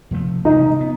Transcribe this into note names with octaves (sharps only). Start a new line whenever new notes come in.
C3 F3 A3
C3 E3 G#3 C#4 D#4
B3